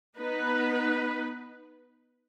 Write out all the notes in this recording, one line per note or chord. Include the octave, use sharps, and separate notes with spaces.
B3 D#4 B4